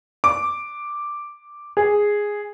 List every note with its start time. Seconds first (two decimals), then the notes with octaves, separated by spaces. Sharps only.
0.24 D6
1.77 G#4